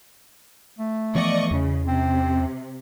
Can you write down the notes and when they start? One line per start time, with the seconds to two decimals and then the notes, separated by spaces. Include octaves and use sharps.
0.78 A3
1.15 E3 F3 B3 D5 D#5 C#6
1.51 E2 C#3 C#4
1.88 C3 C4